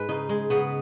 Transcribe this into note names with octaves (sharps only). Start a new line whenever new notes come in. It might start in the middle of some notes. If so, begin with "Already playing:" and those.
Already playing: G#2 G#3 B4
C#3 D#4
G#3
C#3 B3